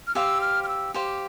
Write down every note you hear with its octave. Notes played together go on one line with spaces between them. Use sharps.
F6
G4 C5 F5 E6
F6
F6
E6
G4 C5 F5 D6